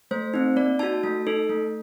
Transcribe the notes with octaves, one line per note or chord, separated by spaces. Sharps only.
A3 C5
C4 D#4
A#3 D5
D#4 F#4 A5
A3 A5
D#4 A4
A3